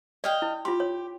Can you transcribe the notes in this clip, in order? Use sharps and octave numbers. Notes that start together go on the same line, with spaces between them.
D5 D#5 F5 G5
E4
F4 G4 C6
C#5